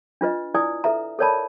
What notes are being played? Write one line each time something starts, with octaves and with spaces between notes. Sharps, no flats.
D4 F4 B4 D#5
E4 B4 D5 G#5 D#6
A4 B4 E5 A#5
A4 A#4 C#5 D5 A5 B5